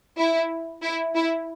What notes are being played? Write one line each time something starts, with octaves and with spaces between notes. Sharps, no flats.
E4
E4
E4